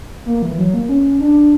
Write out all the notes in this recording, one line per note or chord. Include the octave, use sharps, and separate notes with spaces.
A#3
E3
F#3
A#3
C#4
D4